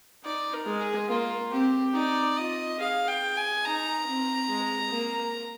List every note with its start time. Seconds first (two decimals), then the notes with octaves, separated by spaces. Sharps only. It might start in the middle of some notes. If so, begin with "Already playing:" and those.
0.24 D#4 D5
0.53 A#4
0.66 G#3
0.81 G#4
1.09 A#3 F4
1.51 C4 G4
1.94 D#4 D5
2.37 F4 D#5
2.79 G#4 F5
3.08 G5
3.22 G#4
3.37 G#5
3.65 D#4 A#5
4.07 C4
4.50 G#3
4.92 A#3